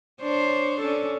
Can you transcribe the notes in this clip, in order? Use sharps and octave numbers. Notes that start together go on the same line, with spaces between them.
D4 C5 C#5
C#4 D4 A4